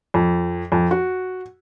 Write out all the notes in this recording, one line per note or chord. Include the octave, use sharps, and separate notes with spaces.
F2
F2
F#4